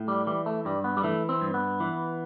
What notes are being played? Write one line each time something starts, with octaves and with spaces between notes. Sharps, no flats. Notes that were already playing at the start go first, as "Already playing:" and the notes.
Already playing: A2
G3
E3 G3
A3
G2 G3
B3
G3
E3 A3
C4
G2
B3
E3